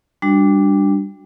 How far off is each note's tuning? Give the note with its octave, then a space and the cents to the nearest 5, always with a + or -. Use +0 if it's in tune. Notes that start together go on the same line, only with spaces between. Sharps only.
G3 +20 D4 +0 F#4 +0